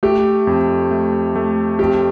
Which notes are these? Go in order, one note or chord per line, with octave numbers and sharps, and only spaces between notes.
A3 G4
F2
A3
A3
F2 G4